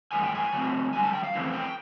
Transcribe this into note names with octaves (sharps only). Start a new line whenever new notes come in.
G2 E3 A3 G#5
G5
G#5
C#3 F#3 A3 C4
F2 D3 G3 G#5
A5
G5
F5
F2 C#3 E3 A3 C4
G5